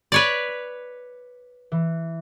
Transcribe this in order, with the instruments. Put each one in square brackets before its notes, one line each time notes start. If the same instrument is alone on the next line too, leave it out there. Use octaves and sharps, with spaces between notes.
[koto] B4 C#5 D5
[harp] B6
E3